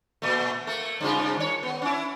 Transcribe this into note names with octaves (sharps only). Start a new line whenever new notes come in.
A#2 A3
A3 A#3
G2 C#3 F4
D#3 C#5
B3
C#4 E4